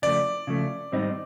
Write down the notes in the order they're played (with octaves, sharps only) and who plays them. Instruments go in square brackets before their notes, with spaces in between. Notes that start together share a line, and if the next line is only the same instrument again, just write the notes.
[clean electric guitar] C#3 F3 A3 [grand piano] D5
[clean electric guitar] C#3 F3 A3
G#2 D#3 G3 C4 D#4